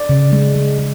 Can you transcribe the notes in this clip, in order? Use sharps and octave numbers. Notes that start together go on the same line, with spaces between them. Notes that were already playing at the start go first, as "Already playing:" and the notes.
Already playing: D5
C#3
G#3
G#3
G#3